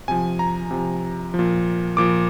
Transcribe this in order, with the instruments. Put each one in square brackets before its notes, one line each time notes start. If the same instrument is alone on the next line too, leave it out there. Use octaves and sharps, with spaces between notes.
[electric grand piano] C3 F3 G#5
A#5
C3 F3
F3
A#2
A#2 F3 D6